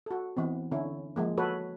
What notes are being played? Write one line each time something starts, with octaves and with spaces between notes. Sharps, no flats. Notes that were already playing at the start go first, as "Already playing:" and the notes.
F#4 A4
E3 B3 C4
D3 C#4 E4
F3 G#3 A#3
F#4 A4 B4 C#5